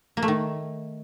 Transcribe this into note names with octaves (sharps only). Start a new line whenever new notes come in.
A#3
A3
D#3